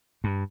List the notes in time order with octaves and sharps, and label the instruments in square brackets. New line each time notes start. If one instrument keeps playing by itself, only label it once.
[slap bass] G2